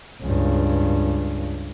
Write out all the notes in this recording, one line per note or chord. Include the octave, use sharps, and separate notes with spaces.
C#2 G2